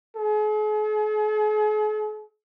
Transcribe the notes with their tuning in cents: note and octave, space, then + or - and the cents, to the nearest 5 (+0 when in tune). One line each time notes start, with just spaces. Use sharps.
G#4 +45